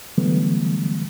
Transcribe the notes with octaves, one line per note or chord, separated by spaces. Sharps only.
D3 E3 F#3 G3 A3 B3